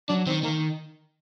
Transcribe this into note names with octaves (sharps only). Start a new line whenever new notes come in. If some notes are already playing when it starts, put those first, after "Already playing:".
F#3 D4
D#3 C4
D#3 A#3